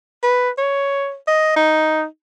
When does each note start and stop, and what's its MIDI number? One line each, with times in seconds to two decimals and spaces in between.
0.23 0.50 71
0.58 1.16 73
1.27 1.52 75
1.56 2.05 63